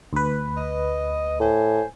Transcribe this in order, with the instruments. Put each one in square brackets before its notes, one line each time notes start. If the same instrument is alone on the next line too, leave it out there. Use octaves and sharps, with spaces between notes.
[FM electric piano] D2 B4
[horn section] D#5
[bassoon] A2 [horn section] C5 G#5